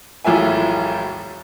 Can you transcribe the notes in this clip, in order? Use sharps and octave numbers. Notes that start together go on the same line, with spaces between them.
E1 B1 A2 F3 E5 G#5